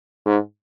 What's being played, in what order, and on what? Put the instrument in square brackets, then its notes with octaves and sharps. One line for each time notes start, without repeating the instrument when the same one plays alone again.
[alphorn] G#2